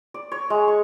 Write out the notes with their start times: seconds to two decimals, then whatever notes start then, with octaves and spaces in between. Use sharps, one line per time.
0.14 D5
0.32 C#5
0.50 G#3
0.68 C#6